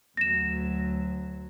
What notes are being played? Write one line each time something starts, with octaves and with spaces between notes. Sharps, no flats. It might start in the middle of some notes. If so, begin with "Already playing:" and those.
D2 F#3 A#6 E7